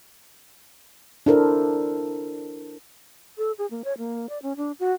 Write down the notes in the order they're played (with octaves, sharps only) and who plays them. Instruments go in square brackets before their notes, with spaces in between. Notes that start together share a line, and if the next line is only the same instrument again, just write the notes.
[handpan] D4 E4 A4 A#4 C5
[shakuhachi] A4
G#4
A#3
C#5
A#3
D5
C#4
D4
F#4